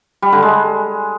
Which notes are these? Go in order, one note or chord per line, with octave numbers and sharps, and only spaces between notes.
G3
D3
G#3